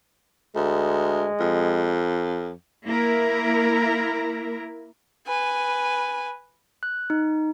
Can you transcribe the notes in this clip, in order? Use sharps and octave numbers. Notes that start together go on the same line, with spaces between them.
D2 G#3
F2
A#3 E4 A#4
B4 G#5
F#6
D#4